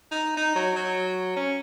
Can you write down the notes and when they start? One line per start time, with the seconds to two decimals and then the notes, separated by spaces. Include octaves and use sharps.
0.11 D#4
0.37 D#4
0.56 F#3
0.76 F#3
1.36 C#4